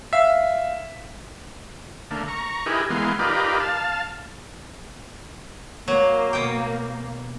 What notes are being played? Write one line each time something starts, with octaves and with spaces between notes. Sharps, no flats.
E5 F5
D3 A3 A#3
A#5 C#6
D#4 E4 G4 G#4 A#4 B4
E3 G#3 A#3 B3 C6
D#4 F4 G4 A#4 B4 D5
F5 A5
F#3 A#3
B2 G5